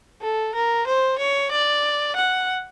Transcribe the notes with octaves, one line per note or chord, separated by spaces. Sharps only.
A4
A#4
C5
C#5
D5
F#5